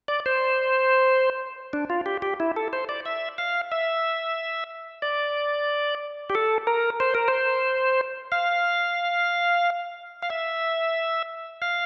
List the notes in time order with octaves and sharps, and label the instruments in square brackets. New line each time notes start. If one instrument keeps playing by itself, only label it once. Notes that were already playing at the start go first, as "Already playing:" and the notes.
[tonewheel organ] D5
C5
D4
F4
G4
G4
E4
A4
C5
D5
E5
F5
E5
D5
G4
A4
A#4
C5
A#4
C5
F5
F5
E5
F5